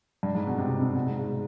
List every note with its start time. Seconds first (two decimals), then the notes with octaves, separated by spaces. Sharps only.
0.23 G2
0.35 G#2
0.47 B2
0.58 C3
0.82 C3
0.95 B2
1.07 G#2
1.19 G#2